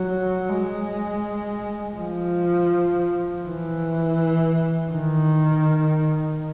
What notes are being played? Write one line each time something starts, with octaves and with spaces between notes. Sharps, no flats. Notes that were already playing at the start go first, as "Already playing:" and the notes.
Already playing: F#3
G#3
F3
E3
D#3